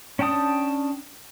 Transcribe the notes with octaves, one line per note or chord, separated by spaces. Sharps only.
C#4 D4 G5 A5 D#6